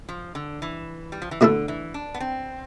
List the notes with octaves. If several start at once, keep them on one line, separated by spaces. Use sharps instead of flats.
F3
D3
E3
G3
F3
E3
B2 D3 A3 E4 A4
E3
D4
B3
C4